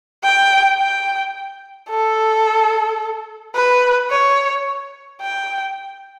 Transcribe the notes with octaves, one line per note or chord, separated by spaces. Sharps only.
G5
G5
A4
B4
C#5
G5